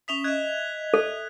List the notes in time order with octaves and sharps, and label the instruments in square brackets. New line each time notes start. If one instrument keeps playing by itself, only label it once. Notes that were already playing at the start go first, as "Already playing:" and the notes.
[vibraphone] C#4 E5 D#6 [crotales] B6 F7 G7
[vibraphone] D#5 E5 [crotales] F#6 G#6
[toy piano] A4 [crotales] F#6